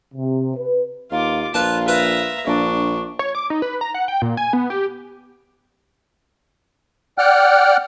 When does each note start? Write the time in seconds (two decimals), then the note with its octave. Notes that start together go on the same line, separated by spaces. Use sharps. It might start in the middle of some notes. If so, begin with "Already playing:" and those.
0.14 C3
0.55 B4
1.12 D#2 F4 F5 D6
1.54 A#1 F4 B4 F5 A5
1.88 F4 B4 E5 A#5
2.47 A#1 D4 C#6
3.19 C#5
3.35 D6
3.50 D#4
3.62 B4
3.81 A#5
3.94 F#5
4.08 G5
4.22 A#2
4.37 G#5
4.53 B3
4.70 G4
7.18 D5 F#5 G5 F6 F#6